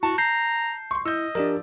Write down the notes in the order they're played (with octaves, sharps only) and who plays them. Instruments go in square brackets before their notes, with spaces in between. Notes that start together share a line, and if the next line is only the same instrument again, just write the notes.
[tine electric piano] E4 [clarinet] F#4 [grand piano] A5
[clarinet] A#5 [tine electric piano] G6 C7
[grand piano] C6 C#6
[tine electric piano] E4 [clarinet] D#5 [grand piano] E6 G6
[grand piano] F3 D5 [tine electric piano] D4 G4 A#4